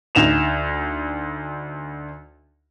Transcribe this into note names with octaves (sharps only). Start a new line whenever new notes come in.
D2 D#4 E7 F7